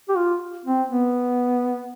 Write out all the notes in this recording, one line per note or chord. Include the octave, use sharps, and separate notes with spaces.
G4
F4
C4
B3